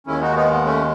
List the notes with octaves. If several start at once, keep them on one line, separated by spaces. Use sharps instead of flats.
D#2 D#3 G#3 C#4 E4
D#4 F#4
B3 D#4
B3
A3 C#4